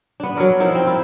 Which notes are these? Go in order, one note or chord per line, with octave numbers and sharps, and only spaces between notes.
B3 D4
F#3 A4 A#4 D5
F3 D#4 E4 A#4
C4
E4 F4